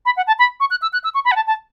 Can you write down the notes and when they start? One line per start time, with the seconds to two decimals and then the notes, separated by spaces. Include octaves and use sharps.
0.05 B5
0.17 F#5
0.27 A5
0.39 B5
0.60 C#6
0.70 F#6
0.82 E6
0.93 F#6
1.04 E6
1.14 C#6
1.25 B5
1.31 F#5
1.36 A5
1.47 A5